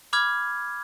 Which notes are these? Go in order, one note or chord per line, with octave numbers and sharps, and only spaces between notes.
B5 D6 F6 G#6